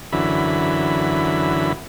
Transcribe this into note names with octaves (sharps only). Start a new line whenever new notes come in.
F#2 D3 E3 B5